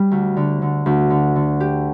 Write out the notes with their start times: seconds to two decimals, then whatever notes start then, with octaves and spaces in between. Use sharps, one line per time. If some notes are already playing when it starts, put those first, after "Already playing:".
Already playing: G3
0.11 D2
0.37 D3
0.62 D3
0.86 D2
1.10 D3
1.36 D3
1.60 G4